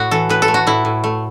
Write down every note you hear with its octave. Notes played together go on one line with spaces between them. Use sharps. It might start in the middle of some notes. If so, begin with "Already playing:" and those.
Already playing: A2 F#4
E3 A4
A2 B4
A4
A3
F#4
A2 E4
A2
A3